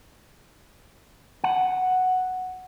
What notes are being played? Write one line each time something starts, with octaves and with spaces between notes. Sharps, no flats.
F#5